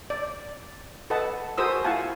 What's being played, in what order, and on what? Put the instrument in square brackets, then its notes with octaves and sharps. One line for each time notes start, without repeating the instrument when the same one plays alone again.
[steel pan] D5
A4 B4 D#5 F#5 A5
F#4 G#4 A#4 C5 D#6 E6
E4 F4 F5 F#5 G#5 A5